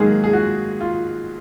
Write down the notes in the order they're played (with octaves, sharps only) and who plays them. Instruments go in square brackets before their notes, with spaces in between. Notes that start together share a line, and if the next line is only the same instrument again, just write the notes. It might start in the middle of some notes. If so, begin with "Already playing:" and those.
Already playing: [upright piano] G#2 D#3 F#3 G#3 A#3 G#4
G#4
F#4
F4